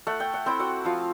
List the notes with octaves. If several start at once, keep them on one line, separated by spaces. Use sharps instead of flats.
A3 F#5
G5
F#5
C4 E4 G5
F#4 F#5
F3 F4 F5